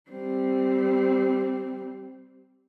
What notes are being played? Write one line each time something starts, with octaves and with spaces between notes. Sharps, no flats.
G3 C4